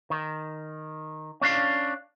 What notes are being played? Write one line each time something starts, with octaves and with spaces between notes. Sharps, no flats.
D#3
C#4 D4 F5